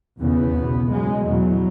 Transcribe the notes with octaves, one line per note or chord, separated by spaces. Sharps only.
E2 C#3 B3
E2 B2
F#2 C#3 G#3
E2 B2 F#3